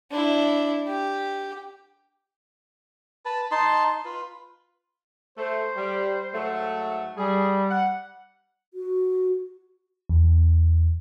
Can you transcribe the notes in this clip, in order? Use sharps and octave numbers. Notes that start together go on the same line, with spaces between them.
D4 E4
G4
B4 A5
D#4 A5 C6
F4 B4
A3 C5
G3
G#2 F#3 A3
G3 G#4
F#5
F#4
E2